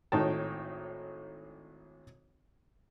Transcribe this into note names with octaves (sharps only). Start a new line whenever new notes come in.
G#1 A2 D#4 C#5 G5 A5